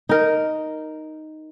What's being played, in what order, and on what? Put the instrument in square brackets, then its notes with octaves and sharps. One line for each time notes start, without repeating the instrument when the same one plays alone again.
[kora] D#4 A#4